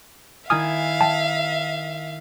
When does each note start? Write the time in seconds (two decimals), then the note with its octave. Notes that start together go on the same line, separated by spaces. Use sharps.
0.50 D#3 E4 E5 F5 G#5 D#6 F6
1.01 G5 A5